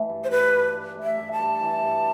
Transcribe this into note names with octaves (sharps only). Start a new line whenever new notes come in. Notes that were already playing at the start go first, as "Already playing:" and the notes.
Already playing: E3 A3
G2
C5
G2 B4
G2
G2
A3
E5
G2
A5
G2
E3
G2